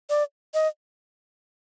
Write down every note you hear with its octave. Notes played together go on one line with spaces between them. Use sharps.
D5
D#5